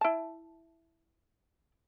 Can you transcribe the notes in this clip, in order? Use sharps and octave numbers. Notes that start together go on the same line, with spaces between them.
E4 A5